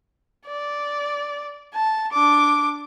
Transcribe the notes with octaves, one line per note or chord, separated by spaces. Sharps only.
D5
A5
D4 D6